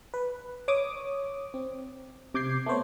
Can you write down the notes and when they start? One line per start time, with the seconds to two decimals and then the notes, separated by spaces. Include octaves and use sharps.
0.14 B4
0.68 C#5 D6 D#6
1.54 C4
2.34 C3 D6 G6 G#6 C7
2.66 A3 B3 C5 C#5